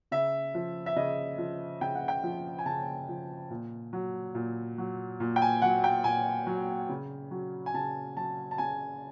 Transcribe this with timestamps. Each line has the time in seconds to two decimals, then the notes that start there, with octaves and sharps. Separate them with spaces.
0.11 C#3 E5
0.55 F3
0.86 E5
0.96 C#3 D#5
1.38 F3
1.81 C#3 G5
1.95 F#5
2.08 G5
2.24 F3
2.59 G#5
2.66 C#3 A5
3.09 F3
3.50 A#2
3.93 F#3
4.35 A#2
4.78 F#3
5.20 A#2
5.36 G5
5.42 G#5
5.62 F#3 F#5
5.84 G5
6.04 A#2 G#5
6.47 F#3
6.89 C#3
7.31 F#3
7.66 G#5
7.74 C#3 A5
8.17 F#3 A5
8.51 A5
8.58 C#3 G#5